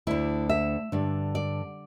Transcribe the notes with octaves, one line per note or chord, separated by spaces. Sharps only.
D2 D3 E4
E5
G2 D3
D5